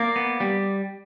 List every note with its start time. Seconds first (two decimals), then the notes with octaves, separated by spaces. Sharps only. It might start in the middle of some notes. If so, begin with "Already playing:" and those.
Already playing: A#3 D5
0.16 B3
0.40 G3